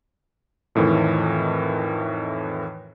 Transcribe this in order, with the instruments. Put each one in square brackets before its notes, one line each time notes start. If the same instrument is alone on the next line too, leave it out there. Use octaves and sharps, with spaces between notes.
[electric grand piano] F2 A2 D#3 E3